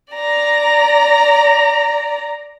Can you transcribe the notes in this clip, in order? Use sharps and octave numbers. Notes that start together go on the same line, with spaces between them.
D5 A#5